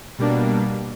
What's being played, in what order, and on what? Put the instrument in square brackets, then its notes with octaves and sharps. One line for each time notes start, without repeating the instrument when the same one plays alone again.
[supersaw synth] B2 G3 A#3 D4